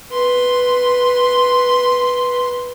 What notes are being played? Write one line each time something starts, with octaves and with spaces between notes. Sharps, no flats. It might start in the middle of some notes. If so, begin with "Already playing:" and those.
B4 C6